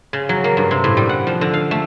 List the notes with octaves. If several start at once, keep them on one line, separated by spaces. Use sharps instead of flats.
C#3
F#3
A#3
G2
C3
A2
G3
F#5
F3
D3
F5
A3